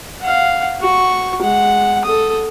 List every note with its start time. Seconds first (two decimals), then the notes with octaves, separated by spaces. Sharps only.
0.21 F5 F#5
0.80 F#4 C#6
1.42 G#3 F#5
2.04 A4 D#6